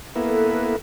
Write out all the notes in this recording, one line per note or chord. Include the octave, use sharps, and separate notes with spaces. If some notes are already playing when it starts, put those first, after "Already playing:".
A#3 B3 E4 A4 B4